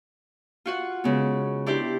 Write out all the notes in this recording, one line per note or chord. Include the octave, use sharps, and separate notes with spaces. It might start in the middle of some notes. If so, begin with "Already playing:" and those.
F4 F#4 F#5
C#3 G#3 B3
D4 E4 G4 C5